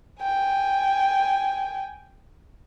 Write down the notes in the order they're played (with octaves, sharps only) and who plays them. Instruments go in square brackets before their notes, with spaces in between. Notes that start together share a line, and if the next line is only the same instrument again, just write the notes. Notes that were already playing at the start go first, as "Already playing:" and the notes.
[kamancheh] G5 G#5